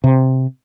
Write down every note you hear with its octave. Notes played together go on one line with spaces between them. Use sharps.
C3